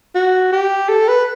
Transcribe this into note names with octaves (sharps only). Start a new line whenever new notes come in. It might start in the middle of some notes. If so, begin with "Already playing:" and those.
F#4
G4
A4
B4